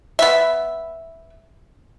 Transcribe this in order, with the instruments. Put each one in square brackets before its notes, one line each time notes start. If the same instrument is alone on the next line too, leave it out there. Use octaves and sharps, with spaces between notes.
[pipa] B3 E5